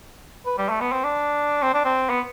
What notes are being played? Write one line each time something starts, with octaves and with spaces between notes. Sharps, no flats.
B4
G3
A3
B3
C4
D4
C4
D4
C4
B3